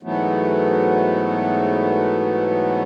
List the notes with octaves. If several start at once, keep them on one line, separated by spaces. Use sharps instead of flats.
G#2 E3 F#3 A3 B3